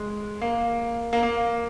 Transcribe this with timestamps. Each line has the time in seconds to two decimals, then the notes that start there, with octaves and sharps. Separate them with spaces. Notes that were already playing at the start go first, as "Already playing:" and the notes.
Already playing: G#3
0.42 A#3
1.13 A#3
1.23 A#3